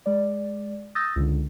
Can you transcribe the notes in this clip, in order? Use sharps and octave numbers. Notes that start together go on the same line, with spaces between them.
G#3 D5
D#6 E6 G6 A6 A#6
C#2 D3